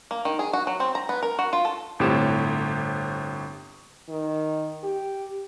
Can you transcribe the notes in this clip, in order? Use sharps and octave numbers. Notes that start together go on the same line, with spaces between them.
A#3
D#3
G#4
F#4
F#3
C4
A#5
B3
A#4
F#4
F4
A4
G1 A2 C4 G4 C#5 E7
D#3
G4